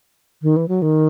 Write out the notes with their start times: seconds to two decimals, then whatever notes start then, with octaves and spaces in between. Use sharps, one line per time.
0.42 D#3
0.56 E3
0.68 F#3
0.82 D#3